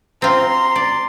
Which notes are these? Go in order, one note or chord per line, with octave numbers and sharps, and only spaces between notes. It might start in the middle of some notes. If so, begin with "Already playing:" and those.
C4 F4 A#5 C6
D5